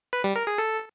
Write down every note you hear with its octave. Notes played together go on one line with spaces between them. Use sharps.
B4
G3
A#4
G#4
A4